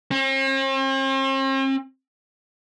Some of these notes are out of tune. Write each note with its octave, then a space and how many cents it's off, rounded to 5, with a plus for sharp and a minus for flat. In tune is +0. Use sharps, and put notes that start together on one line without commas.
C4 +45